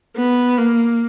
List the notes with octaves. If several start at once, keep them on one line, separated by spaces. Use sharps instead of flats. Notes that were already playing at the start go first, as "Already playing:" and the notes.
B3
A#3